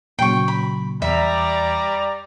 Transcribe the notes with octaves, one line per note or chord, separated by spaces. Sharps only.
A#2 C#3 F#3 G5 C#6
B5
E2 G3 D5 E5 A#5